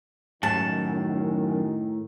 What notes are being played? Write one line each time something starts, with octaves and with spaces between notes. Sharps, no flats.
F#2 A2 D#3 A5